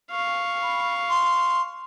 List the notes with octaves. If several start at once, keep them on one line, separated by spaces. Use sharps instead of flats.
F5 C#6
B5
C6